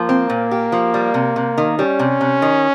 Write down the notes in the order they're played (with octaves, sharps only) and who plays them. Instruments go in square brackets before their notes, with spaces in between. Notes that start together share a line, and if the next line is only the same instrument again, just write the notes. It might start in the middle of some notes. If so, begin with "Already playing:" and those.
Already playing: [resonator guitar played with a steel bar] F3 [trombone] A#3
[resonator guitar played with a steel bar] C4
A#2
G4
F3
G3
C3
C3
D#3
[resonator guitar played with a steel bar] G3 [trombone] C#4
[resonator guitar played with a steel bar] C3
C3
D#3